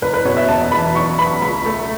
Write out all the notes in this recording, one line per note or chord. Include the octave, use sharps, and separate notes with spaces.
F#1 B4
B4
B2 C#5
E5
E1 A5
E3 B5
B1 C#6
B3 B5
C#2 B5
A3